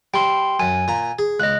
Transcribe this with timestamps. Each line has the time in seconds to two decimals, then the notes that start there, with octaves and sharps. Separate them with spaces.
0.14 G3 G5 C6
0.60 F#2 G#5
0.88 A#2 A#5
1.19 G#4
1.40 C#2 D#5 F#6